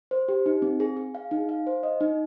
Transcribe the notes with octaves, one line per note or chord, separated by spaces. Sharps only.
C5
G4
D#4
C4
G#4
G#4
F5
D#4
F5
C5
D#5
D#4